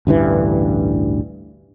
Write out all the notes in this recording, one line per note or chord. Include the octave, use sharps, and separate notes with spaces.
A1 D2 G2 E3